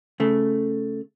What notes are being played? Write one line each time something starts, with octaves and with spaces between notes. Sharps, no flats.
C#3 A3